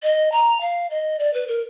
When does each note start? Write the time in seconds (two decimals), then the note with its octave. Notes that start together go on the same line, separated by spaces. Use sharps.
0.03 D#5
0.32 A#5
0.61 F5
0.91 D#5
1.19 D5
1.34 B4
1.48 A#4